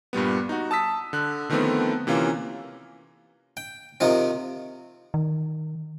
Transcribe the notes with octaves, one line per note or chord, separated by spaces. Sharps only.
G2 A#2 G3 B3
D#4 F#4
A5 D#6 E6 B6
D3 F#6
D3 D#3 F3 A3 B3 C4
C3 E3 A#3 C#4 F4
G5
C3 D#3 F3 C4
D#3